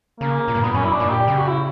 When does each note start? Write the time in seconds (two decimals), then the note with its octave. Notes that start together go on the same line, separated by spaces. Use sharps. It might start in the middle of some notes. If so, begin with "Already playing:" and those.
0.20 C#3 A#3
0.48 A#2
0.55 G2
0.63 A#2 B3
0.74 F#2 C#4
0.84 E4
0.92 D4
1.00 A#2
1.10 G4
1.27 C#3 G4
1.37 F#4
1.48 E4